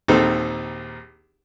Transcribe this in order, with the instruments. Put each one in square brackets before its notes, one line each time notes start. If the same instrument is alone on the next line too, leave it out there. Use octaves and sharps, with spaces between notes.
[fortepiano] A#1 D#2 C4 D#4 A4